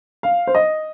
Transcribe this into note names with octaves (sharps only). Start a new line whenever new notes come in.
F5
C5
D#5